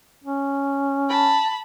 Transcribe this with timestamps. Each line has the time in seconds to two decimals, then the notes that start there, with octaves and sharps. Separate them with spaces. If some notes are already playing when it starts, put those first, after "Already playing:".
0.24 C#4
1.09 A5 B5